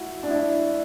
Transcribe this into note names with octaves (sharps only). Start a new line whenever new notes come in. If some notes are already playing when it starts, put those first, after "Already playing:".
Already playing: E4 F#4
D4
E4